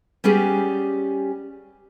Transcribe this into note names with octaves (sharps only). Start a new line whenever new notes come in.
G3 B3 C#4 G4 G#4